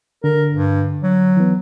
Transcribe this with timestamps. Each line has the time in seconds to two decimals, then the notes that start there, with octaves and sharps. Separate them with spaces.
0.24 D3 A#4
0.51 G2
1.03 F#3
1.37 E3 B3